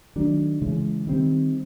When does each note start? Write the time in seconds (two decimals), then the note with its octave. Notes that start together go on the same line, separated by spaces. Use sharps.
0.16 D#3 F#3 A3 D4
0.62 C#3 E3 G#3
1.07 D#3 G3 C4